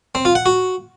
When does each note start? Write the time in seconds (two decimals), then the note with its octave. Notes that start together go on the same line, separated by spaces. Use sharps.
0.15 C4
0.25 F4
0.35 F#5
0.46 F#4